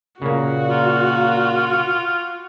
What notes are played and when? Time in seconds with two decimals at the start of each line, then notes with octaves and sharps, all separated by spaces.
0.22 A#2 C#3 A#3 F#4
0.70 F4